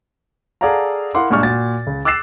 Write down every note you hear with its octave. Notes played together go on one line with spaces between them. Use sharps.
G#4 A4 D5 F5 F#5 A#5
E4 A#4 F5 F#5 C6 D6
G2 A#2 G#3 D4 C#6 F6
A#2 F#4 A6
C#2
D6 E6 F#6 A6 C7 E7